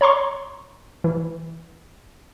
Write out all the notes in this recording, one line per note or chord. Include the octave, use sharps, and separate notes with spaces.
C#5 A#5 C6 C#6
E3